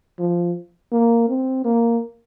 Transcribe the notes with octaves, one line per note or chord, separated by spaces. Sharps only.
F3
A#3
C4
A#3